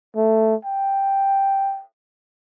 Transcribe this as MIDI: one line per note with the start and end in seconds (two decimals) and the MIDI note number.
0.16 0.55 57
0.65 1.83 79